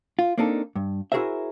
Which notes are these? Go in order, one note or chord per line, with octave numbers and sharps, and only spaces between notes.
F4
A#3 C4 D4 D#4 A4
G2
E4 F#4 G#4 A#4 C5 E5